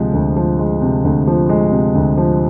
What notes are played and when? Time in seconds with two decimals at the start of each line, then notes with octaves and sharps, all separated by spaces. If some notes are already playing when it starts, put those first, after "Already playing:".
Already playing: D2 C3 F3 G#3
0.13 D2
0.36 F3
0.59 G#3
0.82 C3
1.04 D2
1.27 F3
1.49 G#3
1.72 C3
1.95 D2
2.17 F3